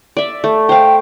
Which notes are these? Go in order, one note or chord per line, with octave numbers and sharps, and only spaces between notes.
D5 E5
A3
C5 F5 G5